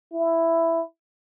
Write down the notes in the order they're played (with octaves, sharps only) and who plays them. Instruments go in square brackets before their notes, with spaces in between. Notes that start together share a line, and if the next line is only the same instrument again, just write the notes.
[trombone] E4